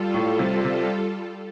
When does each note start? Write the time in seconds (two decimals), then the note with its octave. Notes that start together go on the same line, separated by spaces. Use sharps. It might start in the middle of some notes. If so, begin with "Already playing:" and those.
Already playing: G3 F4 A4
0.14 A2
0.39 C3
0.65 C3